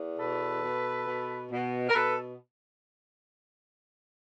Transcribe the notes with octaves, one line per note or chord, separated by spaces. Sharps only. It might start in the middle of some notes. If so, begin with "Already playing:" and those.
Already playing: E2
B2 A4 B4
B2
B2
B2
A#4
B2 A4 B4